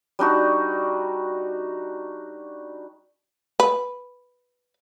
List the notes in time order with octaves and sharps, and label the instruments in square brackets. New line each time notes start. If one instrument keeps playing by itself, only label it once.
[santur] G3 D4 D#4 F#4
[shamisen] B4